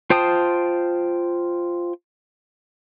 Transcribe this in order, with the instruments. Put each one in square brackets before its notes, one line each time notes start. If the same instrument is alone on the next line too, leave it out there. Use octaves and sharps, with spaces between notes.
[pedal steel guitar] F4 C5 G5 A5 D#6